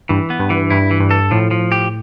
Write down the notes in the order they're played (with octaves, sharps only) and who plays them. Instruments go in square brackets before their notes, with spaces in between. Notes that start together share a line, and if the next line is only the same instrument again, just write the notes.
[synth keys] G2 [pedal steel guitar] E3
[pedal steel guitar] B3
[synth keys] G2
[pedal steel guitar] E3
[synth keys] G2 [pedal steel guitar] E4
[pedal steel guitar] E3
[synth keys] G2
[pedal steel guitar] A4
[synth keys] A2 [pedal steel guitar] F3
[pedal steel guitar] F3
G4